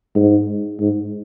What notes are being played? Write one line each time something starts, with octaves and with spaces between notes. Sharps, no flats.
G#2
G#2